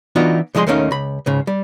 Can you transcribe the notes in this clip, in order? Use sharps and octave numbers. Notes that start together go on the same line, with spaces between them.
E3 B3 D4 D#4 F4 F#4
C2 F3 G#3 G#4 C6
D#2 A3 A#3 C#4 D#4 F5
C#2 B5
C#2 G#2 C#3
G3